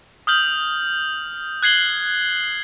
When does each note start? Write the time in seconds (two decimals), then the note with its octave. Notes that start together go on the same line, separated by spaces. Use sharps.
0.27 D#6 F6 G6 F#7
1.63 F#6 G#6 C7 F#7 G7